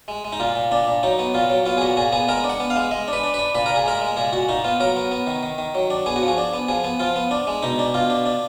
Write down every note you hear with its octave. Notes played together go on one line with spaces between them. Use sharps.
G#3
G#3
D#4
A#2 F4
A#2
A#2 D4
A#2
F#3 D#4
B3
A#2 F4
F#3
B3 F4
G#4
A#2 F#4
A#2 G#4
B3 G#4
G#3 A#4
D4
F#5
B3
F5
G#3
G#3 D#5
D4
B4
D4
D4 B4
A#2 B4
A#2 A#4
G#4
G#3 A#4
G#3
A#2 G#4
A#2 F#4
A#2 D#4
B3 F4
F#3 A#4
B3
B3
D#3
D#3
D#3
F#3
D4
B3 G#4
F#4
F3
G#4
D4
B3
F3 G#4
B3
F3 F4
B3
D4
G#3
B2 D#4
D4
B2 F4
D4
D4